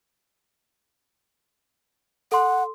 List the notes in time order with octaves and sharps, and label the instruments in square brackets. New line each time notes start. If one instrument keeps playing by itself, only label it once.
[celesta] A4 C6 [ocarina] F#5